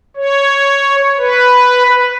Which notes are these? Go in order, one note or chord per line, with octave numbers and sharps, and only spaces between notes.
C#5
B4